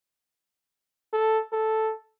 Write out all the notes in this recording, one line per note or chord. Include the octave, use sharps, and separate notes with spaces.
A4
A4